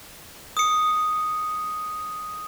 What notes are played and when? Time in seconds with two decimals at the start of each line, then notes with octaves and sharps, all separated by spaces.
0.57 D#6 C#7